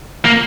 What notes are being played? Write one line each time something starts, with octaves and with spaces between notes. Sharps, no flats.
A#3